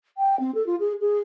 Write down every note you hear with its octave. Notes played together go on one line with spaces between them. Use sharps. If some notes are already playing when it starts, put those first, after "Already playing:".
G5
C4
A4
F4
G#4
G#4